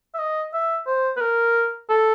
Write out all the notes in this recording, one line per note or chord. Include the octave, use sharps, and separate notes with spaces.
E5
D#5
E5
C5
B4
A#4
A4